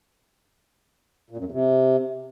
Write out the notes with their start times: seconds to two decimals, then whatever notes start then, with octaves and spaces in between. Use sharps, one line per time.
1.30 A#2
1.37 F#2
1.44 E2
1.51 C3